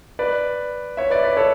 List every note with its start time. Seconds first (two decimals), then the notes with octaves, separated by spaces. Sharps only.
0.19 B4 D5
0.97 C#5 E5
1.10 B4 D5
1.24 B4 D5
1.37 A4 C#5